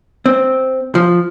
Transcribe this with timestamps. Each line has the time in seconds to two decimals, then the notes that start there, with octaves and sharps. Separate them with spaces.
0.26 C4
0.95 F3